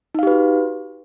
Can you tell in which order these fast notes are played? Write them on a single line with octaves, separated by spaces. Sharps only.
D#4 F5 G4 B4 F#4